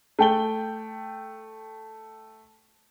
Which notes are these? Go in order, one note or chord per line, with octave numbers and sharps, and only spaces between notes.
A3 G5 G7